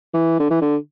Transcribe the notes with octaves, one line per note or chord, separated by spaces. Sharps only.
E3
D3
E3
D3